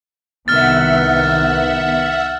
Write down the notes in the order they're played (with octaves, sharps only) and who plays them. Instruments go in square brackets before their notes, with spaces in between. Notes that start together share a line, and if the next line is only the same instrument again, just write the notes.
[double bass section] C2 D#3 B3 [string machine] E5 F#5 [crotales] F6 A6